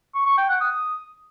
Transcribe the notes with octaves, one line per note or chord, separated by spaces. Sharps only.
C#6
C#6
G5
F#5
D#6